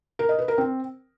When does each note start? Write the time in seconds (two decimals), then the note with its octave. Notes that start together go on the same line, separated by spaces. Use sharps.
0.19 A#4
0.29 D#5
0.39 B4
0.48 A#4
0.58 C4